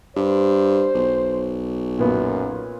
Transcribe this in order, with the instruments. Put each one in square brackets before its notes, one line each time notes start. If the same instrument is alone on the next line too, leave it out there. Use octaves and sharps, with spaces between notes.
[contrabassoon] G2 [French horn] C5
[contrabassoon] B1
[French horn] F#2 [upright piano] A#2 B3